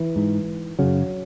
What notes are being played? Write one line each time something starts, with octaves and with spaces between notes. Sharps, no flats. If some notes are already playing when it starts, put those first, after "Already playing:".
Already playing: E3
G#2
F#2 C#3 F#3